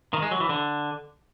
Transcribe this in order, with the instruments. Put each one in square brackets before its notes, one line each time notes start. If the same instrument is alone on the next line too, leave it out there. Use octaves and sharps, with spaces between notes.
[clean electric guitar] D#3
G#3
F#3
E3
D3